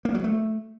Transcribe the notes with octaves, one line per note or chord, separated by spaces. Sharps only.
A#3
F#3
A3